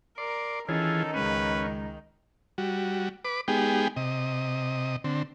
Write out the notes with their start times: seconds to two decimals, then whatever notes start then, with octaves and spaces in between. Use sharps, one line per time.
0.18 A#4 D5 C6
0.69 D#3 E3 C#4 F4 G#4 A4
1.14 C#2 G#3 C#4 B4 D#7
2.58 G3 F#4
3.25 B4 D6
3.48 G#3 B3 D#4 G4 G#4 G5
3.96 C3 D#5
5.04 D3 C4